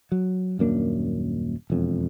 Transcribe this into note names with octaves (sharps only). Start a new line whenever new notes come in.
F#3
D#1 F#2 A#3 D4
E1 F2